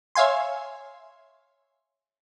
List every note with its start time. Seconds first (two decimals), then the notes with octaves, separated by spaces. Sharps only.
0.15 C#5 E5 F5 G#5 C6